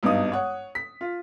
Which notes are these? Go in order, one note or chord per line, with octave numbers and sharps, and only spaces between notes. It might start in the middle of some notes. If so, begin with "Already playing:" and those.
G#1 G2 B3 D#4 D#6
C#5 F#5
B6
F4